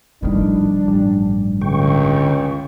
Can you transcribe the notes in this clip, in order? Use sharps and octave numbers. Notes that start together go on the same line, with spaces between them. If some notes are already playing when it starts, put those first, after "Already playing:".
A#1 A2 D#3 F3 G3 D4
A1 G2
C#2 D3 G5 C#6